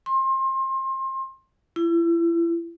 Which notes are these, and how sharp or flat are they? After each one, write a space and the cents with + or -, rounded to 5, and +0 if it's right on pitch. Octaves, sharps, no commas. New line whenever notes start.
C6 +30
E4 +35